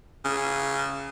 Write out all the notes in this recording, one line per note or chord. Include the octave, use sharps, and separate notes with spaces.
C#3